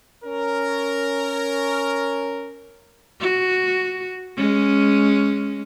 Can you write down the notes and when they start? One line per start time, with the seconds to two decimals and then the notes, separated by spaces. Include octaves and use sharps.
0.24 C#4 A#4
3.20 F#4
4.37 G#3 C#4